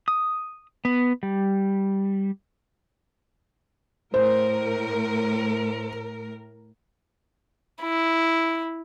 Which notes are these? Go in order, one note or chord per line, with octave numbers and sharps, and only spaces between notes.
D#6
B3
G3
A2 A#4 C5
E4